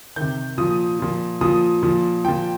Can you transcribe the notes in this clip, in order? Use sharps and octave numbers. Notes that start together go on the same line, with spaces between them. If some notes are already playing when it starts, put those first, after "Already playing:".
C3 D#3 G6
A#2 F3 D#6
A#2 F3
A#2 F3 D#6
A#2 F3
A#2 F3 G5